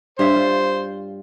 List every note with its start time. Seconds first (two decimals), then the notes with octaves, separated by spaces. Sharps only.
0.19 G2 C5 C#5 E5
0.36 F4